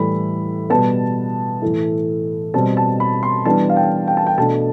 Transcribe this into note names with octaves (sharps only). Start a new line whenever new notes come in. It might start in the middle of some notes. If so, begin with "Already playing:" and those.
Already playing: A2 E3 G3 B5
B2 G3 B3 A5
A2 E3 A3 E4
B2 G3 C4 A5
A5
B5
C6
E3 G3 B3 D4 A5
F5
G5
G5
A5
G5
B2 A3 D4 A5